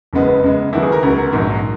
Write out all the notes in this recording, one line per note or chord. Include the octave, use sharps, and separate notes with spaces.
F#1 F#2 C#3 G#3 B3
F#2 C#3 G#3
D#2 C#3 F#3 B3 E4
G#4
A#4
C#2 C#3 F#3 A#4
A#4
A#1 G#2 F#3 A#3